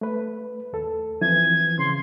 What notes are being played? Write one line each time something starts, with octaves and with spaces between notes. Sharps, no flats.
A3 B4
D#2 A4
E3 F3 C4 G#6
C#3 C6